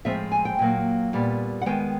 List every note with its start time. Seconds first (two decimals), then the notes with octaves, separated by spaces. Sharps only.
0.05 A2 F3 G#3 C4 E5
0.32 G#5
0.45 G5
0.59 A#2 F#3 A#3
1.13 A#2 G3 B3
1.62 F#5
1.66 D#3 G#3 B3 G5